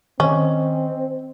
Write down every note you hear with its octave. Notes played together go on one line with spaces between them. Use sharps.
D#3 C4 C#4 C5 D#5